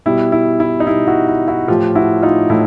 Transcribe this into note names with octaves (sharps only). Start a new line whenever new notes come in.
B2 G3 E4
E4
E4
D#4
B2 G3 E4
E4 F#4
E4
E4 F#4
A2 F3 F4 G4
E4 F#4
D#4 F4
A2 E4